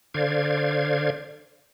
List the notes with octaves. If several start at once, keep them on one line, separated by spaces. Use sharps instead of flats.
D3 C5 D5 F5 G#6